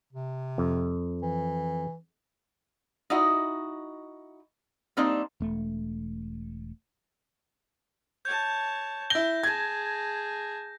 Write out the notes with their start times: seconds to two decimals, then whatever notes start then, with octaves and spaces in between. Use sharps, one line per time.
0.13 C3
0.58 F2
1.22 E3
3.10 D#4 E4 F#4 D#5
4.97 G3 A#3 C4 D4 D#4
5.40 E1 A3
8.25 C#5 A5 G6
9.10 E4 G6 A#6 G7
9.43 G#4 A5 G#6